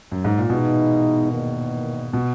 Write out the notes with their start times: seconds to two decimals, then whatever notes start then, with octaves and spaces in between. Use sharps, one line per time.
0.12 F#2
0.25 G#2
0.38 A#2
0.50 B2 E3 G#3 B3 D#4
1.32 E2 D#3 A#3
2.13 B2